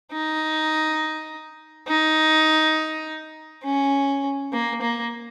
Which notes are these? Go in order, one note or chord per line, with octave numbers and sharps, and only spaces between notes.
D#4
D#4
C#4
A#3
A#3